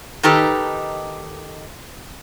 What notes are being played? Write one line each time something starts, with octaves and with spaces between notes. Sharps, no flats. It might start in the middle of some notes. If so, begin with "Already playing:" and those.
D#3 D#4 G4 A4 B4